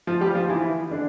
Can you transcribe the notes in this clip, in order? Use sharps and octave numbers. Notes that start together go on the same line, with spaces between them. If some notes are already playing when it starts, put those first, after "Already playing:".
F3 F4
G3 G4
F3 F4
E3 E4
D3 D4